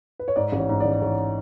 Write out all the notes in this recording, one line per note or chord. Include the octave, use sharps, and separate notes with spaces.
B4
C#5
G#2 D5
A1
C#5
G#2
D5
A1
A1 C#5